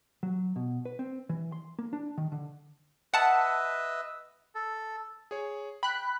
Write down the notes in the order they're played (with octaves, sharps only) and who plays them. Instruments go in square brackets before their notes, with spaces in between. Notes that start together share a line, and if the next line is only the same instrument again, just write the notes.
[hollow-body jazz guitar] F#3
B2
B4
C4
E3
C6
A#3
D4
D#3
D3
[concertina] B4 D#5 E5 [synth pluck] F#5 A5
[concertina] A4
[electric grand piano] G#4 C#5
[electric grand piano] G5 [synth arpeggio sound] B5 F#6